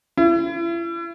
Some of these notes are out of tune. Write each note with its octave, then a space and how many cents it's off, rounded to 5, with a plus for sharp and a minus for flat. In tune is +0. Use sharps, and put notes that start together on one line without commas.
E4 +40